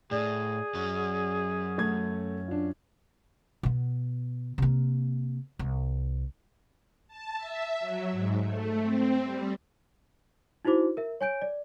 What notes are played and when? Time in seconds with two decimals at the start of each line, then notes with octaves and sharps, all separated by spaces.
0.11 A2 G#4 D5
0.74 F#2 F#3 C#4
1.78 A3 G#6
2.48 D4 F4
3.63 B2 B3
4.58 C3 A#3
5.59 C2
7.08 A5
7.37 E5
7.80 F#3
8.11 G#2
8.42 A3
8.81 C4
9.23 G3
10.65 D#4 E4 F#4 C5 D6
10.97 A#4 E5
11.21 C#5 G#5 G6 D7
11.42 D5